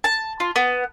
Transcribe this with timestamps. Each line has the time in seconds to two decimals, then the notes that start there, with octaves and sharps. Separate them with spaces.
0.04 A5
0.40 F4
0.56 B3